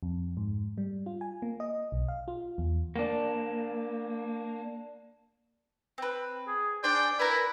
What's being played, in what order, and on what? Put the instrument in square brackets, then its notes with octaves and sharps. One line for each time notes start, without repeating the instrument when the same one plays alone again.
[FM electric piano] F2
G#2
G3
F4
G#5
A#3
D#5
B1
F5
F4
E2
[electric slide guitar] A#3 D4
[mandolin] C4 B4
[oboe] G#4
[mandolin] D4 G#4 C5 [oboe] D5 [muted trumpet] G5
[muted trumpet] E4 [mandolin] A#4 B4 [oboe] B5